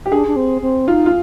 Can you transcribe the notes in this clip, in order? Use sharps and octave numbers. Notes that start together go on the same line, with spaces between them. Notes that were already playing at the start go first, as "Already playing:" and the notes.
G4
D4 G#4
D4
C4
C4
D#4 F4
F4